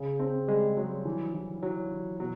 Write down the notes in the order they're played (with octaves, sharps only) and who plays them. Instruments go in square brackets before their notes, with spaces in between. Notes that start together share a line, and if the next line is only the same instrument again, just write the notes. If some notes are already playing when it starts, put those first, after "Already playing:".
Already playing: [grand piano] C#3
C4
[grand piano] G3 [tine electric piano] G#3
[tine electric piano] F#3 [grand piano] G3
[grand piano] E3
E3
[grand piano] E3 [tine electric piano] F#3
[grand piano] E3
[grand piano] B2 [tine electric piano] F#3